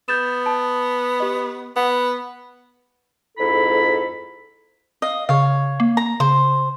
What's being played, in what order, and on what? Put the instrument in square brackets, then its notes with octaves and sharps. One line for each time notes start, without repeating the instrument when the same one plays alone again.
[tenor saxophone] B3 [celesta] G6 A6 E7
[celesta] A5
G4 D#5
[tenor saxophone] B3 [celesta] F#5
[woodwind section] F2 G#2 E4 A4 B5
[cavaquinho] D#5 F5
[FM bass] C#3 [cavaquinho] C#5 F5
[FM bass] A#3
[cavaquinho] A#5
[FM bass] C#3 [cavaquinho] C5